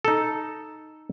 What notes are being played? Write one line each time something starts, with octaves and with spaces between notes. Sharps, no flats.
D#4 A4